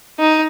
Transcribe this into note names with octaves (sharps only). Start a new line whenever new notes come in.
D#4